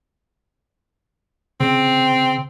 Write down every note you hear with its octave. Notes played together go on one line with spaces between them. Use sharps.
C#3 C4